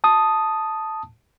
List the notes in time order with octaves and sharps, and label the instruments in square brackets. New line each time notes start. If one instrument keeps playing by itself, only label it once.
[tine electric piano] A5 D#6